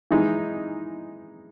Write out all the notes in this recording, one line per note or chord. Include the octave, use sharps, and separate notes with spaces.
E3 G#3 D#4